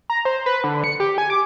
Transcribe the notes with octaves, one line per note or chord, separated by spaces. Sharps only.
A#5
C5
B4
D3
C#7
G4
G#5
D6